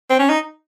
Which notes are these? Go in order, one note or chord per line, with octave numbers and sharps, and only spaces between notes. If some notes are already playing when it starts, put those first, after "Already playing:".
C4
C#4
D#4